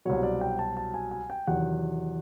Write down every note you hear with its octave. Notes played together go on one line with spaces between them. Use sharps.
C2 B2 F#3 C#5
D5
G5
A5
A5
G#5
G#5
G5
E2 C3 D#3 F#3 F#5